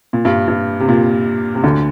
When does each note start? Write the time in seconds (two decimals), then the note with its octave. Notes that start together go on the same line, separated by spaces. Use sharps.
0.13 A#2
0.25 G2
0.48 G2
0.80 C3
0.89 A#2
1.55 C3
1.64 D2 D3